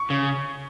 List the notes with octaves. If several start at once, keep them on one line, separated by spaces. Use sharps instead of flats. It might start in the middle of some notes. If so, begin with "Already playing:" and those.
Already playing: C#6
C#3